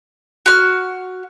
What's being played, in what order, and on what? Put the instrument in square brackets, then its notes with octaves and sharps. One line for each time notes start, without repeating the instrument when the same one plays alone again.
[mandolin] F#4 F6